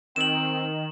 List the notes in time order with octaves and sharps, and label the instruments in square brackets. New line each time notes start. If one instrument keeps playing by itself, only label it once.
[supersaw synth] D#3 [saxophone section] C4 [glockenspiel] E7 F#7